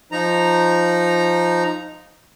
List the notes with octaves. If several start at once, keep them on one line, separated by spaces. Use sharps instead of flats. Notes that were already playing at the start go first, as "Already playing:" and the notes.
F3 D#4 A#5